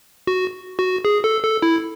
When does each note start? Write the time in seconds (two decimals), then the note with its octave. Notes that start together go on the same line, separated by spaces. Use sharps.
0.27 F#4
0.79 F#4
1.05 G#4
1.24 A4
1.43 A4
1.62 E4